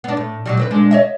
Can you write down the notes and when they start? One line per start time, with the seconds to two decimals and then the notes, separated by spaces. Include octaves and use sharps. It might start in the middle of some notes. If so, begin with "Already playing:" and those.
0.04 B3 D4
0.17 A2
0.46 B2 F#3 G3
0.57 D2 C4 B4
0.71 A#2 G#3 D4
0.91 C#5 D#5 E5